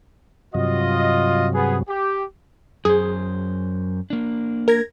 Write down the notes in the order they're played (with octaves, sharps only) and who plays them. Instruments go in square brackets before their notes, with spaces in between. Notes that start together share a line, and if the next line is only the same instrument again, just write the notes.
[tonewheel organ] G2 C3 F#3 [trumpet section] F4 D#5
[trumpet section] B3 G#4
G4
[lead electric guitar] F#2 C5 [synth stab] G#4
[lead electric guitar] A#3 D4
[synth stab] A#4 G#6 A#6